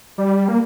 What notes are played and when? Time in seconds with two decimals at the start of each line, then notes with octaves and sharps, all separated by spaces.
0.18 G3
0.48 A#3